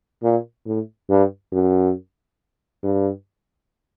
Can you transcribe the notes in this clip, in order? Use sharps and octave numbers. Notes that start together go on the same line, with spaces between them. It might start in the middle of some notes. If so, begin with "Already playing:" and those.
A#2
A2
G2
F#2
G2